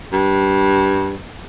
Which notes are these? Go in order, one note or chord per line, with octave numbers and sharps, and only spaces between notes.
G2